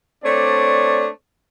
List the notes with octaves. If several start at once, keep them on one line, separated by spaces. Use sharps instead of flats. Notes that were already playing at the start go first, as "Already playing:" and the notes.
A3 C4 D4 C#5 D5